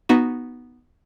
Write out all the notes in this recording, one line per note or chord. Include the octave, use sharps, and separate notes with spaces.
B3 D#4 F#4